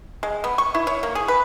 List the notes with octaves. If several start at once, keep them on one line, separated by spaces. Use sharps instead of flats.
G#3
B3
C#6
E4
C#5
A#3
G#4
B4